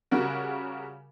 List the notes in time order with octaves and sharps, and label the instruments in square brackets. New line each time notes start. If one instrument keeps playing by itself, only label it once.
[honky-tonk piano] C#3 G3 F#4 A#4